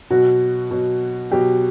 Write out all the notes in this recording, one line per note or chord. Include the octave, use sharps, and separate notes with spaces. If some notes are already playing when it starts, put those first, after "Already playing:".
B2 F#3 F#4
B2 F#3
B2 F#3 G4